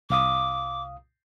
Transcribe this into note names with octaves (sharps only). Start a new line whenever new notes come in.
C2 F5 D6 D#6